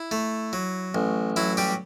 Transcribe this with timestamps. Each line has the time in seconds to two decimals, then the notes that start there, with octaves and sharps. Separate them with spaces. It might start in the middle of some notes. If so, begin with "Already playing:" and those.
Already playing: E4
0.11 A3
0.53 F#3
0.95 A1
1.36 F#3 E4
1.57 G3 G4